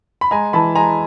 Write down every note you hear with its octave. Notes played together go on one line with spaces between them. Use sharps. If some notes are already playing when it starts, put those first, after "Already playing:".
B5
G#3 G#5 A#5
E3 A5 B5
G#3 G#5 A#5